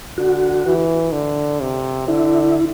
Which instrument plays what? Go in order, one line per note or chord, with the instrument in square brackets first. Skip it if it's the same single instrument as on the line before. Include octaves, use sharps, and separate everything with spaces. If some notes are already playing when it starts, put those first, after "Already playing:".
[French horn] D3 [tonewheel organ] F#4
[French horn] E3
D3
C3
[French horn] D3 [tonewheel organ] E4